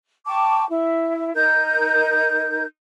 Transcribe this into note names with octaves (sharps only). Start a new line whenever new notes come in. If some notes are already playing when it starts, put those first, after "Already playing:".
G5 A5 C#6 D6
E4
D#4 A#4 G6